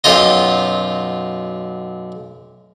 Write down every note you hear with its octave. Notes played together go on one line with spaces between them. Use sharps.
B1 F#2 F4 D#5